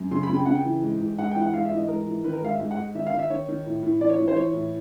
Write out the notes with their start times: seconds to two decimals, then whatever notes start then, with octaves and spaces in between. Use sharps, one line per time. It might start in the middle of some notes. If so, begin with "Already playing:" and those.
Already playing: F#2
0.11 C#3 C6
0.23 B5
0.29 C#3
0.35 G5
0.46 C#3 F#5
0.55 G5
0.65 E3
0.82 G#2
1.01 G#2
1.19 G#2 F#5
1.31 E3 G5
1.42 F#5
1.53 G#2 F5
1.65 E5
1.71 E3
1.77 D#5
1.88 G#2 A#4
2.07 E3
2.24 D#3 B4
2.33 A#4
2.42 G#2 F5
2.50 E5
2.60 G#2
2.71 F#5
2.77 G#2
2.95 D#3 E5
3.07 F5
3.13 D#3
3.19 E5
3.30 D#3 C#5
3.48 D#3
3.66 A2
3.83 A2
4.00 E3 D5
4.09 C#5
4.18 E3
4.28 C5
4.36 E3 C#5
4.53 A2